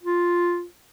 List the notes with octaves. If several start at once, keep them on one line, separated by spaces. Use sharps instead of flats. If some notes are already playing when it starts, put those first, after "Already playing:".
F4